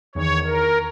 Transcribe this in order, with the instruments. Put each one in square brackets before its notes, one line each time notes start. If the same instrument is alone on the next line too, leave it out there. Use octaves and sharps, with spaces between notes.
[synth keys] E2 D#3 [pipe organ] C#5
[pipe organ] A#4